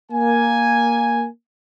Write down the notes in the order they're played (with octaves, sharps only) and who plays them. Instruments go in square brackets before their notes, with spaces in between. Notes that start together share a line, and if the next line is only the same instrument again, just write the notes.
[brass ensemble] A#3 G#5